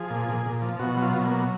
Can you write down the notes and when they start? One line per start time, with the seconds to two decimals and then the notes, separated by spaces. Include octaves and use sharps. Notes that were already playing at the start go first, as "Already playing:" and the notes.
Already playing: F3 G#4
0.11 A#2
0.29 A#2
0.46 A#2
0.62 F3
0.79 B2 F#4
0.97 F#3
1.02 F4
1.13 B2
1.25 A#3
1.31 F#3